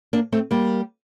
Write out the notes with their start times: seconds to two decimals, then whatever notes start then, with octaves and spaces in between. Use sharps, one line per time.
0.13 A#3 D4
0.32 A3 C4
0.51 G3 A#3